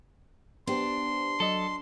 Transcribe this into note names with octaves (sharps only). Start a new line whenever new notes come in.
B3 D4 G4 C5 C6
F#3 A4 D#5